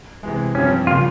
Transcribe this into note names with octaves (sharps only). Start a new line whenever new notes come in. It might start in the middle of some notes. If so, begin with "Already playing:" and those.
C3 E3 G#3
G2 F3 C4 C#4 G4
C#3 G3 A#3 F4